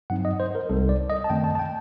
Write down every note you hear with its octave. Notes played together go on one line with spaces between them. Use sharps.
G2 F#3 C4 D#4 F#5
D#5
C5
A#4
C2 C3 G3 C4 D#4 A4
D5
D#5
A5
F#2 D#3 A3 C4 G5
A5
A5
G5